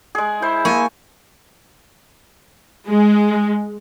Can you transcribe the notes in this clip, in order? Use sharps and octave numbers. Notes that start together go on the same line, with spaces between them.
G#3 G#4
E4 C5
A#3 G#5 A5 C#6
G#3